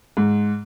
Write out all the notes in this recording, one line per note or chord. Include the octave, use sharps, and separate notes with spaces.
G#2